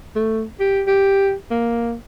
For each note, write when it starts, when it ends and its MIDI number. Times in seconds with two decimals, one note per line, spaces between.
0.16 0.44 57
0.60 0.82 67
0.87 1.34 67
1.51 1.94 58